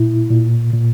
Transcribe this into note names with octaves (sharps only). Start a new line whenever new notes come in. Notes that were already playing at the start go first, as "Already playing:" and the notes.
Already playing: A#2 E4
A#2
A#2